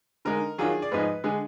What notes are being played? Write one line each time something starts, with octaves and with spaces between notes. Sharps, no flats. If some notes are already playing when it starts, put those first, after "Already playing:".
D3 G#3 D#4 A#4
D#3 F#3 D4 F4 G#4
D5
G#2 F3 G#3 D#4 B4
D3 G#3 G#4